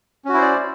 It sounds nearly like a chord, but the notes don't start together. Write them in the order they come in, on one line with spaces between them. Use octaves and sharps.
C#4 F#4 E4 C5 D5